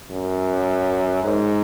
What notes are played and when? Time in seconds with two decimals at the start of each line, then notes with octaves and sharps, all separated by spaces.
0.11 F#2
1.23 G#2